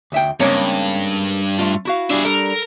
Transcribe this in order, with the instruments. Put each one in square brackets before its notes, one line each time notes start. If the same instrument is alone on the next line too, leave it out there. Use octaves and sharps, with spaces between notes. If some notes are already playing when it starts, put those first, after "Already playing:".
[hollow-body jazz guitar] D2 E5 G5
[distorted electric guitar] G2 [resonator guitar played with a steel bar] C#3 G#3 A#3 [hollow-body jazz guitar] C4 C#4 C#5
[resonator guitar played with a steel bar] A3 F4
E4 F#4 F5
[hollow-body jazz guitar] G3 D4 [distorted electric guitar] G#4 E5
[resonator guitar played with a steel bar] A4 [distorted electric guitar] A#4